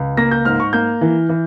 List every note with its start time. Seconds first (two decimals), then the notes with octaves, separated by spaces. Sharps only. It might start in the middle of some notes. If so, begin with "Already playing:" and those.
Already playing: C#2
0.17 A#3 A#6
0.31 G6
0.45 G#2 F6
0.60 C#6
0.73 A#3 G6
1.01 E3
1.29 E3